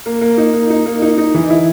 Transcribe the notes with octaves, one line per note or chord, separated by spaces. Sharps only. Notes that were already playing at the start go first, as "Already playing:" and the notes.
A#3
A#3
D#4
A#3
D#4
A#3
D#4
D#4
E3
E4